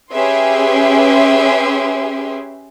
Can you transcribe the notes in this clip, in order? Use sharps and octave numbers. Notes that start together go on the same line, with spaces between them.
C#4 G4 G#4 B4 E5 C6